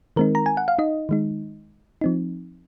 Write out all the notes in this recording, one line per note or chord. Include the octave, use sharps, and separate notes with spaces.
D#3 G#3 C4 D#4 A#4
A#5
G#5
F#5
F5
D#4 D#5
D#3 G#3 D#4
F3 C4 D#4